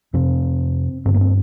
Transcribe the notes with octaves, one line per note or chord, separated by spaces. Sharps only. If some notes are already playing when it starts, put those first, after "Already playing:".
F2 C3 C4
G2 D3 C4
A#3
C4